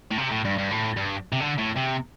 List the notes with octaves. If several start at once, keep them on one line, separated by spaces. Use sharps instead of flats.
A2
C3
A2
G2
G2
A2
G2
C3
D3
A2
C3